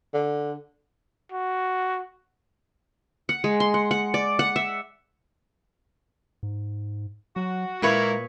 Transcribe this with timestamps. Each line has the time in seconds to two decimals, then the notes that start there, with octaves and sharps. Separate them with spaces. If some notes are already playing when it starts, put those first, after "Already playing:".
0.14 D3
1.32 F#4
3.29 F#5
3.44 G#3
3.60 C6
3.74 F#5
3.91 F#5
4.14 D5
4.39 F#5
4.56 E5
6.43 G#2
7.36 F#3 F#4
7.82 A#2 G#3 A#3 E4 B4 C#5